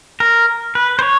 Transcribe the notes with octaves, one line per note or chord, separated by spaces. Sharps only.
A#4
B4
C5
C#5